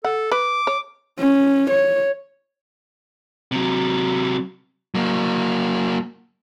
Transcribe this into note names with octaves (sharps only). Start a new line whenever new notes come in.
A4 F#5
B4 D6
C#5
C#4
C#5
C3 F#3
F#3 A#3